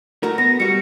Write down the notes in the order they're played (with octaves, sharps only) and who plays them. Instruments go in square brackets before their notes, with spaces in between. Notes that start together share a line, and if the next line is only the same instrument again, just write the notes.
[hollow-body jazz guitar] A3 F#4 A#4
[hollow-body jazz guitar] B3 [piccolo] A#6
[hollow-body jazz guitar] G3 F#4 [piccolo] C#7